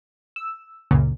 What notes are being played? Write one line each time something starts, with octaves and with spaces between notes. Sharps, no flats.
E6
C#2 F#2 A#2 C#3